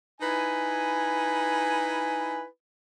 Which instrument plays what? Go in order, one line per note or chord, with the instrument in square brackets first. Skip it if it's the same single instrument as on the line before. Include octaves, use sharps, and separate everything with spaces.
[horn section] D#4 E4 B4 G#5